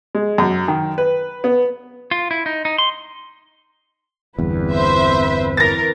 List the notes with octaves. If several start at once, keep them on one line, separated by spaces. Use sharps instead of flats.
G#3
F#2
D#3
B4
B3
F4
E4
D#4
D#4
C6
G1 E2 C4 B4
C5 E5
E3 A#4 A6 A#6